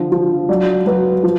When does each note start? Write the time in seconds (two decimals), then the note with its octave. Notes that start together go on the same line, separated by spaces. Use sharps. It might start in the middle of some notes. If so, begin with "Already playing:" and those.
Already playing: D3 F3
0.12 F3
0.49 F#3 D5
0.86 F#3 B4
1.23 F3